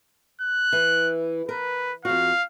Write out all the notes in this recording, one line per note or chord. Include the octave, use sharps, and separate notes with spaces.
F#6
E3
A#4 B4
F2 F#4 F5